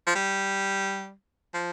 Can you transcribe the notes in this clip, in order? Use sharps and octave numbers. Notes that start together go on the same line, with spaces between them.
F3
G3
F3